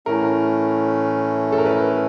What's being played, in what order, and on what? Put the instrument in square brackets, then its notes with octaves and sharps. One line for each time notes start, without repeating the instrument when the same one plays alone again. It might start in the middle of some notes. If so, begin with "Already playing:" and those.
[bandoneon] A2 E3 A3 C#4 [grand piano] A#4
[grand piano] A4
A#4
B4